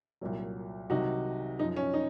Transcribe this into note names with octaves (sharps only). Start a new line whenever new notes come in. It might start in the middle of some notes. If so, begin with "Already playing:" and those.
C2 A#2 F#3
C2 C3 D#3 F#3 D#4 F#4
F#2 F3 D#4
C#4
D#4